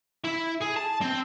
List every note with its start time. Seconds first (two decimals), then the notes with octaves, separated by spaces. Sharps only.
0.24 E4
0.61 G#4
0.76 A5
1.01 C4